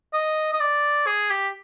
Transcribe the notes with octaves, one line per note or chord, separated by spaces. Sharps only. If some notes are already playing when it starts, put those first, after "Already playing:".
D#5
D#5
D5
G#4
G4